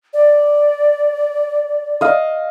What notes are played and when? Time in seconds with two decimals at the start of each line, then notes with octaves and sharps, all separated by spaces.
0.13 D5
2.01 D#5 F5